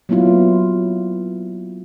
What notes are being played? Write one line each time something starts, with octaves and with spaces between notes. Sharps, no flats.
F#3 A#3 B3 E4 F4